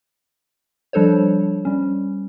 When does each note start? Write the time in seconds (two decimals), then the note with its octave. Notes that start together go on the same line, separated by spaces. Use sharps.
0.93 F3 G3 D4 A4 C5 C#5
1.65 G3 C#4